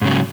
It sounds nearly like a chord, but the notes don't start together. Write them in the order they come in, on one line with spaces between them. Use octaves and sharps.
G#2 C#3 F#3